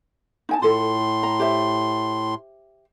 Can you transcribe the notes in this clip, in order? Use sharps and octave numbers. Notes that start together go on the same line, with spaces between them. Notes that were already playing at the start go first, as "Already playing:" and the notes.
D#4 G#5 A5
A2 F4 A4 C6
A#5
G4 C5 E5